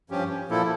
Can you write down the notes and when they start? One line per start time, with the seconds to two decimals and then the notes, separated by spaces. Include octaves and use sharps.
0.10 G2 F3 C#4 G4
0.49 A#2 F3 A#3 E4 A4